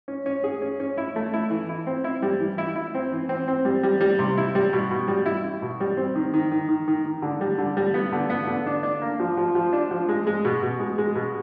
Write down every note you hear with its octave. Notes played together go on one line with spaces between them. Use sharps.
C#4
C#4
G#4
C#4
C#4
E4
A3
E4
E3
E4
C4
E4
G3
E3
E4
E4
C4
E3
C4
C4
G3
G3
G3
C3
E4
G3
B2
B2
G3
E4
E4
B2
G3
C4
D#3
D#3
D#3
D#3
D#3
D#3
D3
G3
D3
G3
B3
D3
B3
D3
D4
D4
A#3
F3
F3
F3
D4
F3
G#3
G#3
B2
B2
G#3
G#3
B2